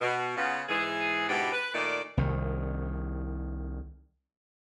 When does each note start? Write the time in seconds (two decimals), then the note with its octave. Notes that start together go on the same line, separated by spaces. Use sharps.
0.01 B2
0.37 C#3 B3 F4
0.69 G#2 E3 G#4
1.29 G#2 B2 B3 D4 E4 G4
1.52 B4
1.74 A#2 D#3 A3 D#4 D5
2.17 C2 D#3